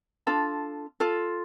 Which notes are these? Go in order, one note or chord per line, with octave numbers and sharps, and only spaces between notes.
D4 F4 A4
F4 A4